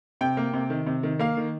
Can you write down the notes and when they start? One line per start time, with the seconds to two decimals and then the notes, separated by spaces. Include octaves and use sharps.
0.21 C3 G5
0.37 A#3
0.54 C3
0.70 D#3
0.86 C3
1.03 D#3
1.19 A#3 F5
1.37 D#3